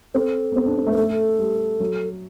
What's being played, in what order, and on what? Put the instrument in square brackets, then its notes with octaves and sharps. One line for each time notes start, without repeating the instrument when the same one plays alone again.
[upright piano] C4 [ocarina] A4
[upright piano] B3
C4
D4
C4
A3
[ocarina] B4
[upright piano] A3 [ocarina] A4
[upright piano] G3
F#3